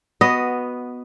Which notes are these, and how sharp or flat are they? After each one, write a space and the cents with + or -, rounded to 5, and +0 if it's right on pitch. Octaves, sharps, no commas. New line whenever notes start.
B3 +0 F#4 -5 D#5 +0